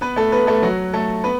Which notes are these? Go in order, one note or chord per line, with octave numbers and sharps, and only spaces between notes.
B3 B4
A3 A4
B3 B4
A3 A4
F#3 F#4
A3 A4
B3 B4